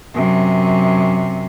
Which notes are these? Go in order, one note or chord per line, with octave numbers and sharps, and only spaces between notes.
F#2 C3